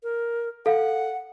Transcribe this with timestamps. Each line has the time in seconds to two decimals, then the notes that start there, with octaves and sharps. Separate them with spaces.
0.03 A#4
0.66 A4 F5 F#5